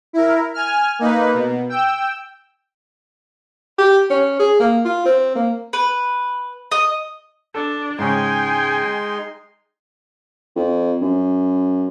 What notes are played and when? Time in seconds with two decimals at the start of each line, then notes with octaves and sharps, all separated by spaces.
0.13 E4 A#4
0.54 G#5 F6
0.99 A#3 D#4 B4
1.33 B2
1.69 G5 E6
3.78 G4
4.10 C#4
4.39 G#4
4.59 A#3
4.85 F4
5.05 C4
5.35 A#3
5.73 B4
6.72 D#5 D#6
7.55 D4 A4
7.99 G#2 C#3 G#3 D#4 G5 G#5 C6
10.56 F2
11.01 F#2